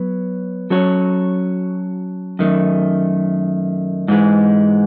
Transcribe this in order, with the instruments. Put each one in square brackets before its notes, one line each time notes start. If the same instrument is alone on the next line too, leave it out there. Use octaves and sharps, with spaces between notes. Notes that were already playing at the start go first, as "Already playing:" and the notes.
Already playing: [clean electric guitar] F#3 B3
F#3 C#4 F#4 A4 C#5
F#2 D#3 A3
G#2 E3 G#3